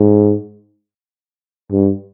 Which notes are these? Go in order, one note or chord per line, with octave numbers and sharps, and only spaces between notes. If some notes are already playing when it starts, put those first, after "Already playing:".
Already playing: G#2
G2